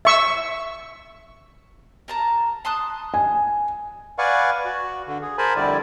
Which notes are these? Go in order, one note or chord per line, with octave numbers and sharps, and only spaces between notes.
E5 C#6 E6
A#4 A5 A#5
A5 C6 D#6 F#6
G#5
B4 D5 F5 F#5 G#5 C#6
F#4
D3
G#4
A#4 C5 G#5 A5 B5
F2 D3 G3 E4 D5